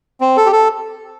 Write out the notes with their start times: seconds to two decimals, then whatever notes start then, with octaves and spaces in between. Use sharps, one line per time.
0.21 C4
0.37 A4
0.46 G4
0.52 A4